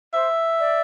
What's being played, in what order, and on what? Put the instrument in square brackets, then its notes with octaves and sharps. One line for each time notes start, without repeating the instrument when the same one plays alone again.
[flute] C5 [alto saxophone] E5
[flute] D5